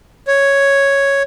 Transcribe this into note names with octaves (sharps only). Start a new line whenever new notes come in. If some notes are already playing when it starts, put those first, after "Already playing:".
C#5